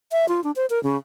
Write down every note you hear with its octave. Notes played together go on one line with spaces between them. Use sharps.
E5
F4
D4
C5
A#4
C#3